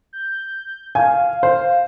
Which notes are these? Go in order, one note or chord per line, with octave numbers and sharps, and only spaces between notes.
G6
F5 G#5
C5